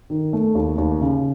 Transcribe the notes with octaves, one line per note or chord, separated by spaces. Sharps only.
D#3
A3
D#2
D#2
C#3